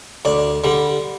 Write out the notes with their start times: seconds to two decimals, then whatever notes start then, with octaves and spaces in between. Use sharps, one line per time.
0.25 D2 D5
0.64 D3 G3